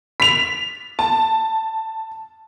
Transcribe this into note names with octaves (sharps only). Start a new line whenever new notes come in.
B6 F7
A5